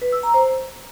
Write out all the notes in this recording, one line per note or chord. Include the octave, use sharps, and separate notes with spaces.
B4
E6
A#5
C5